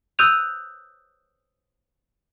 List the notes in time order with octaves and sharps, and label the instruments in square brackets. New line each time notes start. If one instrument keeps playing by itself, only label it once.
[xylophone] D#6 E6 F#6 G6 D#7 F7